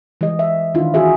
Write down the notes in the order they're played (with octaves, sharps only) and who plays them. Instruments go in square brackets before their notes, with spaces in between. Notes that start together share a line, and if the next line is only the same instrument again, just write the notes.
[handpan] E3 G#3 G4 D#5
E5
D#3 D4 E4 F4
E3 F#4 G#4 E5